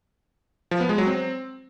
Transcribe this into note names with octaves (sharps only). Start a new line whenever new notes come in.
F3
B3
G#3
F#3
C4